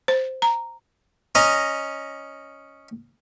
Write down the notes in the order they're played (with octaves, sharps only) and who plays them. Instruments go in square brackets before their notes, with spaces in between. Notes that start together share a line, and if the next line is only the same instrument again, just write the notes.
[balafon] C5
A#5
[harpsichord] C#4 D#5 A#5